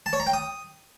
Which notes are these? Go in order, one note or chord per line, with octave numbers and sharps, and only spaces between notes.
A5
C#5
A#5
G5
D#6